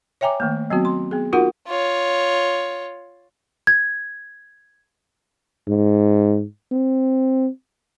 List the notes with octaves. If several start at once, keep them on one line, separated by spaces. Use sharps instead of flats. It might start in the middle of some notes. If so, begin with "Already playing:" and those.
C#5 E5 G5 G#5 A#5 D6
D#3 A3 A#3
F#3 B3 C4 F#4
C6
B3 G#4
D#4 F4 F#4 A#4 F#5 C#6
F4 C#5
G#6
G#2
C4